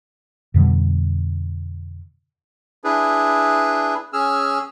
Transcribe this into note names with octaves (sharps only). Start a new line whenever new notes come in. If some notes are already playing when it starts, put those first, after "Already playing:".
F2 B2 D3 G3
D4 E4 G#4 B4
C#4 G#4 E6 F6